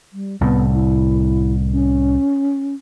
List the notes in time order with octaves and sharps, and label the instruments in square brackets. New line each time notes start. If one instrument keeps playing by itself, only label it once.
[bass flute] G3
[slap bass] C2 A2 [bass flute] B3
[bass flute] E4
C#4